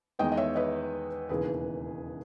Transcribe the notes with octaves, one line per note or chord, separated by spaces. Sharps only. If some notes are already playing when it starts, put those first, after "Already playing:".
E2 D#3 G#3 B3 D#5 G5
D#5
C#5 E5
B4 D#5
E1 D#2 C#3 E3 G#4 B4